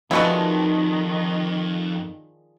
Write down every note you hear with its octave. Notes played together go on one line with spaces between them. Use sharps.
F2 D#3 F3 G#3 D4 E4 F#4 B4